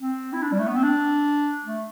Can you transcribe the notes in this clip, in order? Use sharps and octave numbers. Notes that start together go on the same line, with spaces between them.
C4
E4
D4
G3
A3
B3
C4
D4
A3